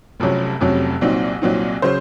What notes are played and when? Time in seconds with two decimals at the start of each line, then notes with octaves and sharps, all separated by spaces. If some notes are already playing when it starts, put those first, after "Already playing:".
0.20 F1 F2 C3 F#3 C#4
0.60 F1 F2 C3 F#3 C#4
1.01 C2 A#2 F#3 C4 D#4
1.42 C2 A#2 F#3 C4 D#4
1.82 C#3 F#3 C#4 C5